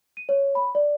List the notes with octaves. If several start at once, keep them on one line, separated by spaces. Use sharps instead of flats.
D#7
C#5
B5
D5